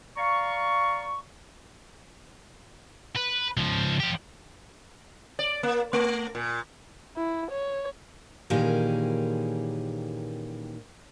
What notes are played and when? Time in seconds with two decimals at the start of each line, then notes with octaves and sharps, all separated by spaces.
0.17 D5 F5 A#5 C#6
3.16 B4
3.57 C#2 F3
4.00 F3 G4
5.39 D5
5.63 A#3
5.93 A3
6.35 A#2
7.17 E4
7.50 C#5
8.50 A#2 D#3 E3 C#4 G4 G#4